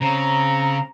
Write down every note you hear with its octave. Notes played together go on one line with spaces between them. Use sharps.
C#3 C4 A#5